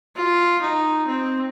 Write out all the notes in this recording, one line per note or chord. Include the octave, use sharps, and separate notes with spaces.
F4
D#4
C4